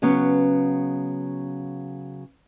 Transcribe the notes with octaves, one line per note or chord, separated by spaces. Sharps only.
C#3 F#3 B3 C#4